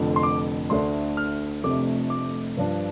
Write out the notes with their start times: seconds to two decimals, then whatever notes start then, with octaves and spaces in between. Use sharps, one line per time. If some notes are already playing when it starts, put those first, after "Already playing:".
Already playing: F1 F2 D3
0.16 C6
0.23 D6
0.70 D2 D3 A3 D4 C6
1.17 F6
1.63 F1 F2 C3 A3 D4 D6
2.10 D6
2.57 G2 F3 D4